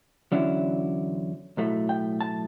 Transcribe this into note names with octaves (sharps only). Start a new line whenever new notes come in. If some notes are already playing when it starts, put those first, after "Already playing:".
E2 D3 F#3 C#4 E4
B1 A2 F#3 A3
G5
A5